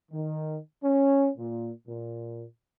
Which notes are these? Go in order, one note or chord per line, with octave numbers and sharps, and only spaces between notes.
D#3
C#4
A#2
A#2